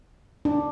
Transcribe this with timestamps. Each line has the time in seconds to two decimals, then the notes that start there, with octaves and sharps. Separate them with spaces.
0.45 D4